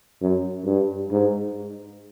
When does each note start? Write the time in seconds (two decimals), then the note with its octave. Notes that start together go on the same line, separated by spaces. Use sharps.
0.22 F#2
0.66 G2
1.11 G#2